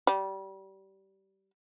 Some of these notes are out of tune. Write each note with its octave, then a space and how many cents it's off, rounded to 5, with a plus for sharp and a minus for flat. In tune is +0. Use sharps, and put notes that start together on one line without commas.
G3 -25